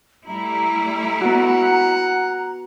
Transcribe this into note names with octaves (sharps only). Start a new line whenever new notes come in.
G3 A3 E4 A#5
B3 F#4 F#5